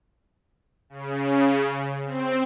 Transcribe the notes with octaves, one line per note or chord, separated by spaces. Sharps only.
C#3
C4